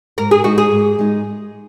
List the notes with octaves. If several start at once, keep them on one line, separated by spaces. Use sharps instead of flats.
G#2 A#4
G#4
G#3 D#4 F#4
G#4
G#2
G#3 D#4